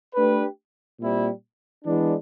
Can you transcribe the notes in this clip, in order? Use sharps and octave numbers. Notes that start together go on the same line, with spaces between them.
A3 D4 G4 B4
A#2 G3 C4 E4
E3 G#3 B3 D4